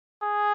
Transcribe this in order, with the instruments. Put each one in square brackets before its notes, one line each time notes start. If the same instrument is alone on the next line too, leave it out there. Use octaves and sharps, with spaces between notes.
[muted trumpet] G#4